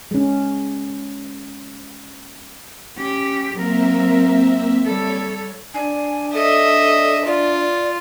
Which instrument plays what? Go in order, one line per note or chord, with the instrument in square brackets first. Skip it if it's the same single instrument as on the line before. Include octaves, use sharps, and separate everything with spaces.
[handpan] G#3 C#4
[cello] C#4 G4
[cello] F#3 A#4 [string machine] A#3 C4 E5
[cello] G3 A4 [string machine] C#5
[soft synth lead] D4 [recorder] G#5
[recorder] A4 [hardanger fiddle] D#5 E5
[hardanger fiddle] F4 [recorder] D5